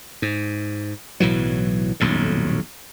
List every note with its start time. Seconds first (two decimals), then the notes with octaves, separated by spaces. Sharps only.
0.22 G#2
1.20 B1 A2 E3 F#3
2.00 D#1 B1 F2 A2